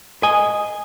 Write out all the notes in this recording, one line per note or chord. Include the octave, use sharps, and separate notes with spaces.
D#5 G#5